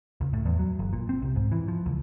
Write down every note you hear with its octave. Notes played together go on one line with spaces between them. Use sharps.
C#2
A2
E2
F#3
G1
A#2
C4
C2
G#2
E3
F3
C#2